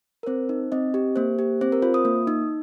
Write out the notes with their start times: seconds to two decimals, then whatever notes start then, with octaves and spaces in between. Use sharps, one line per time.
0.23 A#4
0.27 C4 C5
0.49 D#4
0.72 C4 D#5
0.94 G4
1.16 A#3 C5
1.39 G4
1.61 C4 C5
1.72 A#4
1.82 F4 C5
1.94 D#6
2.05 A#3
2.27 D#4